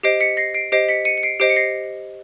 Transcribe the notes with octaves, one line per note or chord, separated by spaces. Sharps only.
G4 C5 D#5 C7 D7
B6 C#7
A#6 C7
C7 D7
G4 C5 D#5 C7 D7
B6 C#7
C#7 D#7
C#7
C7 D7
G4 C5 D#5 C7 D7
C#7
A#6 C7